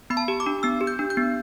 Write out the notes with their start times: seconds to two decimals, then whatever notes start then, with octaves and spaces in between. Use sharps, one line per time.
0.10 B3 B5
0.17 A5
0.28 G4
0.40 D6
0.46 D4
0.63 B3 E6
0.81 G4
0.87 G6
0.99 D4
1.10 G6
1.17 B3